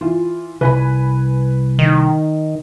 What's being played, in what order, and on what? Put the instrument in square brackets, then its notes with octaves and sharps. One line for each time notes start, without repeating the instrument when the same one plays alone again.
[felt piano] E3 F4
[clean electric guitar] C2 [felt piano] B4 G#5 B5
[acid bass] D#3 [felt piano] D#4